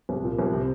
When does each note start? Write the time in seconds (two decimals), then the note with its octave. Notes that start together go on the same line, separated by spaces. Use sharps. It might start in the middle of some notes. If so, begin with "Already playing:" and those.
0.09 C2
0.24 A#2
0.39 C2
0.53 C3